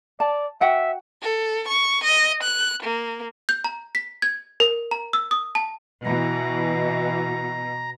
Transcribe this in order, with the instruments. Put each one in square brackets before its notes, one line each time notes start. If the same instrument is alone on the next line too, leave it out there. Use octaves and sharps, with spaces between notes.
[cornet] D5 [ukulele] A5
[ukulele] F#4 F#5 G5 [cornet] E5
[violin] A4
C#6
D#5
F#6
A#3
[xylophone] G6
A#5
B6
G#6
A#4
A#5
E6
D#6
A5
[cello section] B2 [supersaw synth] E3 [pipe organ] A#5